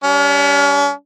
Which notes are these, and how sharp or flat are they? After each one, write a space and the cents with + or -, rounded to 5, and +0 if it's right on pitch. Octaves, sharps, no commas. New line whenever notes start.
G3 +0 C#4 +40